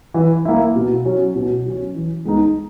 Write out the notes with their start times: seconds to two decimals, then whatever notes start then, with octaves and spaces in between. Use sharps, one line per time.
0.14 E3
0.45 A#3 E4
0.76 B2
1.05 F#3 C#4
1.36 B2
1.66 F#3 C#4
1.95 E3
2.25 G#3 B3 D#4